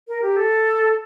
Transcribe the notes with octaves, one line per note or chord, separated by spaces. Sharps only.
A#4
G4
A4